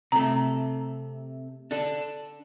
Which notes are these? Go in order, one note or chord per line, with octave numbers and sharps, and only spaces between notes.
C3 A3 A#5
D4 A4